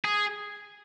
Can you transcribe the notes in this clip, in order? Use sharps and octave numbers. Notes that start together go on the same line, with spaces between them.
G#4